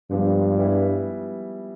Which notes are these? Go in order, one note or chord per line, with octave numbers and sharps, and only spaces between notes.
G2 F3 G#3 B3 D4 F4
G3 B3 E4 G#4 B4